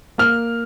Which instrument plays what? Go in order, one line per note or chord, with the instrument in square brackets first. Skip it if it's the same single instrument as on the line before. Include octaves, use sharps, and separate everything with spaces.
[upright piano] A#3 F6